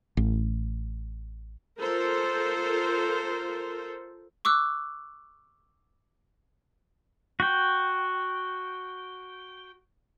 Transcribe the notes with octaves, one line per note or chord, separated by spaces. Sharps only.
A1
F4 A4 A#4 C5
C#6 D6 E6 F#6
F#4 G5